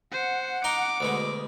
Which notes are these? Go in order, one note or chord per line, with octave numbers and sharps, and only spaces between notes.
C5 F#5
D#4 A#5 C6 D6
D2 B2 G#3